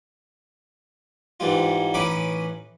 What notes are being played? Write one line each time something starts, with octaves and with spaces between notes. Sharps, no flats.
G#2 E3 G3 F4
A1 C#4 D#4 B4 B5 D6